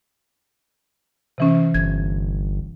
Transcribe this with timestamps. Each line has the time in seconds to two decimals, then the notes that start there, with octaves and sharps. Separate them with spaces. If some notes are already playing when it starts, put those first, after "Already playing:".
1.38 C3 E3 C#4
1.74 G1 G#6